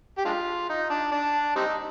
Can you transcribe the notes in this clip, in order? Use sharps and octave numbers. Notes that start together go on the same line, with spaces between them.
G4
G#3 D4 F4
D#4
D4
D4
G3 C4 D#4